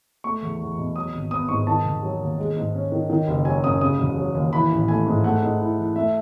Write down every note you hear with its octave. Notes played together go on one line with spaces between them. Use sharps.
A3 C#6
E2
E2
B2
F#3 D#6
G#1
B3 D#6
G#2 C#6
D#3 A5
E1
F#3
D#2
G#3
G#2
C#4
D#3
D#3
F#1
F#3 G#5
F#2 D#6
C#3 D#6
E1
F#3
D#2
E3 B5
A1
A3 G#5
G#2
A3 F#5
G#2
E4
E3
A3 E5